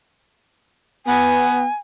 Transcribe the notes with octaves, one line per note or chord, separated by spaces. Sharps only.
B3 G#5